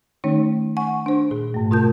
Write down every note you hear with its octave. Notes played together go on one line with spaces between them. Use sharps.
D#3 A3 C#4 D#4 C#5
F#5 G#5 C#6
D4 C5
A#2 G#4
G#2 A3
B2 A3 F4 A#4 A5 G6